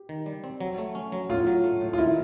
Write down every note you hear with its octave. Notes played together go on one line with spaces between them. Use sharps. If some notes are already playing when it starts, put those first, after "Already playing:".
Already playing: G4
D#3
G3
C4
F#3
A3
C#4
F#3
A2 F4
F#3
A3
A2
F4
D#3 E4